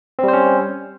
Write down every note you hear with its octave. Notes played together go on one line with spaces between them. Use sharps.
G3 C4 C#4 C5